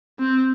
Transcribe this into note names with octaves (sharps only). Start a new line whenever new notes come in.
C4